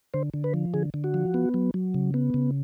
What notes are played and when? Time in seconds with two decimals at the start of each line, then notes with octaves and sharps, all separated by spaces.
0.14 D3 C5
0.34 D3
0.44 B4
0.54 F3
0.74 D3 G#4
0.94 D3
1.04 F#4
1.14 F3
1.34 B3
1.54 F#3
1.74 F#3
1.94 C#3
2.14 B3
2.34 C#3